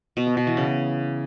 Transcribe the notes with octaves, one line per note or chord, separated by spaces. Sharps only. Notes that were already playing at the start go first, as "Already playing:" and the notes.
B2
B3
B2
E3
C#3